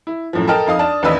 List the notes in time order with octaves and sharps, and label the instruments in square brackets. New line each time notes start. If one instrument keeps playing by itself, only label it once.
[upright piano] E4
F#2 A2 F3
A4 A#4 D#5 G5 A5 F6
F2 D#4 F5 D#6
D4 A5
A1 D#2 D4 B4 D#5 E6